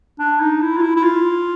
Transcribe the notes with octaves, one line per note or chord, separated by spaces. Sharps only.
D4
D#4
E4
F4
E4
E4
F4